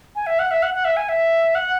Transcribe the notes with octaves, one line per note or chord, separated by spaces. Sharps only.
G#5
E5
F#5
E5
F#5
F#5
E5
G#5
E5
F#5